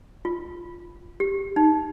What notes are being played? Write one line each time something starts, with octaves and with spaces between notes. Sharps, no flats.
F4
G4
D#4